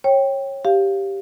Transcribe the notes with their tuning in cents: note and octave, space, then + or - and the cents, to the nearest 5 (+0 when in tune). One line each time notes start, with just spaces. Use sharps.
C#5 -20 G5 +0
G4 +0 F5 -5